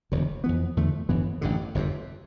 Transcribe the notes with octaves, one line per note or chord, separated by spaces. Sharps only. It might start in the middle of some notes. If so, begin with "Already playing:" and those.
E1 D2 D3
F2 E3 B3
E2 D3 F3 A3
G1 G2 E3 B3
A1 G2 D3
G1 F2 C3